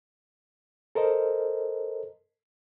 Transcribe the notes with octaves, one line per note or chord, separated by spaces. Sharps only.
A4 A#4 C5 D#5